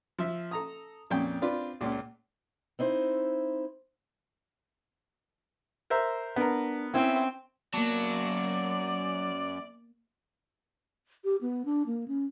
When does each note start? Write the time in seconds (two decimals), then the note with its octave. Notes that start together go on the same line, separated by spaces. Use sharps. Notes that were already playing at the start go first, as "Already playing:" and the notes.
0.19 F3 E5
0.51 A4 A#5 D#6
1.10 F2 A#2 C#4 G5
1.42 C4 D4 F4 B4 D5
1.81 C#2 A#2
2.79 C4 D#4 E4 C5
5.90 A#4 C5 E5
6.36 B3 D4 A#4
6.94 C4 C#4 E4 E5
7.74 F#2 F#3 A#3 B3 D5 A5
11.25 G4
11.41 B3
11.65 D4
11.87 A#3
12.08 C#4